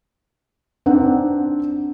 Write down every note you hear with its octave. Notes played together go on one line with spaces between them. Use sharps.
C4 D4 D#4 F#5